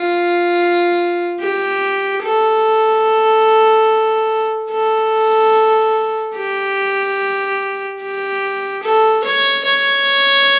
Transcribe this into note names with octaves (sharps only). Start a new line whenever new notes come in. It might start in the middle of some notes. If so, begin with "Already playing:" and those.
Already playing: F4
G4
A4
A4
G4
G4
A4
C#5
C#5